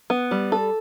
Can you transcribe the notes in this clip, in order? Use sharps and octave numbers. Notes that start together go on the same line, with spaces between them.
B3
G3
A4